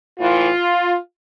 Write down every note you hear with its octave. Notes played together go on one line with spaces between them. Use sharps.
A2 E3 F4